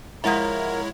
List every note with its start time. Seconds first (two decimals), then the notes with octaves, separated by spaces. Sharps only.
0.24 F3 G#3 E4 A#4 C#5 E5 F#5 A#5